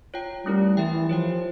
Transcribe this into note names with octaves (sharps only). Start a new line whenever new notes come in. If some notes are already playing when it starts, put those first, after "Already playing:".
F4 C#5 G5
G3 A3 C#4 E4 A#4
E3 G4 A#4 E5 G5
F3 G4 C#5 G5